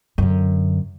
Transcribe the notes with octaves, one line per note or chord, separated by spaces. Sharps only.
F#2 D3